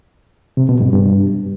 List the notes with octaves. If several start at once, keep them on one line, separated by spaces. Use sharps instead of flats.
C3
B2
G2
G2